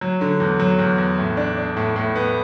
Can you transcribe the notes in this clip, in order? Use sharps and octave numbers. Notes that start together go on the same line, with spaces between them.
F#3
D3
E2
F#3
E2
E2
A2
D4
D4
A2
A2
B3